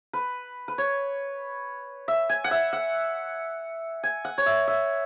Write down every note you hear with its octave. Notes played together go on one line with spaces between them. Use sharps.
B4
B4
C#5
E5
G#5
F#5
E5
F#5
G#5
F#5
C#5
E5
E5